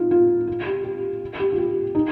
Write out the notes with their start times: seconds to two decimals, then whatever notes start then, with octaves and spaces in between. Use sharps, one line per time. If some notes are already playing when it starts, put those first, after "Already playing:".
Already playing: D#4 F4
0.11 F4
0.47 F4
0.66 G4
0.84 G4
1.40 G4
1.52 F4
1.58 G4
1.95 D#4